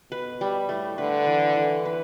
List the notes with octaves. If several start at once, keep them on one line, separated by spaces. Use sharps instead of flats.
B2 B4
G3
A2 A3
D3 B4
E3
E3
B4